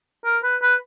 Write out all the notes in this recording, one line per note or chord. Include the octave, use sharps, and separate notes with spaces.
A#4
B4
B4